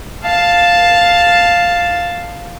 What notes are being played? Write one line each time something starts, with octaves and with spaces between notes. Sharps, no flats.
F5 A5